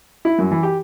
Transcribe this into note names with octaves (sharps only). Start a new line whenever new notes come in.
E4
F#2
E3
G4